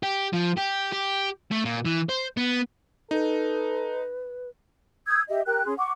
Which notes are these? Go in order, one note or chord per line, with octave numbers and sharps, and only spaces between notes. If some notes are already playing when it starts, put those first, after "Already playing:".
G4
F3
G4
G4
A3
A#2
E3
C5
B3
D#4 A4 B4
D#6 E6 G6 G#6
G4 D#5 E5
G4 A#4 G5 F#6
C#4 G#4 C6
F#5 C#6 D6